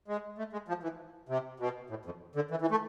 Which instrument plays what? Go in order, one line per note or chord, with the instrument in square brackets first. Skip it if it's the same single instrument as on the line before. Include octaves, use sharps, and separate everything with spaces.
[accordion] G#3
A3
G#3
F3
E3
C3
B2
A2
F2
D3
E3
E3
A3